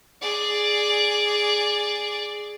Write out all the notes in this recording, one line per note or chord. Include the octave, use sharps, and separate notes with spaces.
G#4 D5